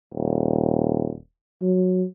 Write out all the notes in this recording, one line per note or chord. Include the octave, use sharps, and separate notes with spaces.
D#1
F#3